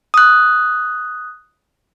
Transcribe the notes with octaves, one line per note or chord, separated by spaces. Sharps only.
D#6 F#6